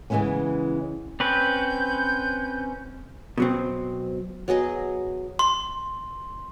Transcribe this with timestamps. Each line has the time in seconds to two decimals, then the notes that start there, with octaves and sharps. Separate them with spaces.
0.10 C#3 E3 F3 G#3 B3 C#4
1.20 C4 C#4 B4 G6
3.38 B2 F#3 C4
4.48 F#3 B3 G#4 D#5
5.39 C6